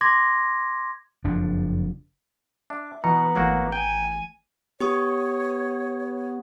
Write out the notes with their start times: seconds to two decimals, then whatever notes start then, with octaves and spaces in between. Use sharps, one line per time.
0.01 C6 D6 G#6 A#6
1.24 F#1 F2 F3 D4
2.70 D4 E5 D6
3.04 B2 E3 B3 A#5 C#7
3.35 G#1 E3 F#3 A3 A#3 F#4
3.72 G5 G#5
4.80 B3 G4 C#5 C#6 D#6